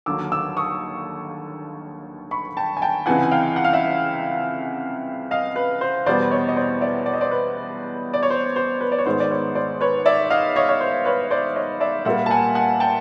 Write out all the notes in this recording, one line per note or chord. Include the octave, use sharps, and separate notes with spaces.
D#2 D3 F#3 D6 E6
D6 E6
C#6 D#6
B5 C#6
G5 A5
G#5
G5 A5
C#2 C3 E3 F#5 G#5
G#5
F5 G5
F#5
F5
E5 F#5
D#5 F5
B4
C5
E2 B2 G3 B3 C5 D5
C#5 D#5
D#5
C5 D5
D5 E5
D5
D#5
C5 D5
B4
D5
C#5
C5
C5
B4
D5
C#5
G#2 D#3 G#3 B3 C5
D5
B4 C#5
C5 D5
B4 C#5
D5 E5
D#5 F5
C#5 D#5
C#5
C5
B4 C#5
C5 D5
C#5 D#5
D5 E5
A#2 G3 A#3 E5 F#5
A5
F#5 G#5
F#5 G#5
G5 A5